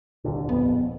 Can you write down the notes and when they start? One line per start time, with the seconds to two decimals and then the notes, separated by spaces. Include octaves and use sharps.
0.24 D#1 C2 D3
0.49 D#1 A#1 F2 B3